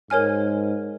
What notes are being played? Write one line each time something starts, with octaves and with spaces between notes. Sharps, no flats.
G#2 A#4 C#5 G#5 F6